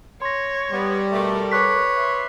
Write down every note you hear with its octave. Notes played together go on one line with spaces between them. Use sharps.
C#5 C6 A#6
G3 B3
B2 A3 A4 A#4
B4 C#5 D6 F#6 B6
E5 C6